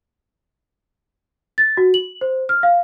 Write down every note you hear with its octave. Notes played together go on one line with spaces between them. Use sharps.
A6
F#4
F#7
C5
F6
F5